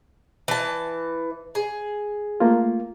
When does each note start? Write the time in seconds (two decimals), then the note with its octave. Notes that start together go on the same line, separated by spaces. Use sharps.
0.48 E3 A5
1.55 G#4
2.40 A3 A#3 F4